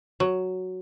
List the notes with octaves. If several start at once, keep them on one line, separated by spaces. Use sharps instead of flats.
F#3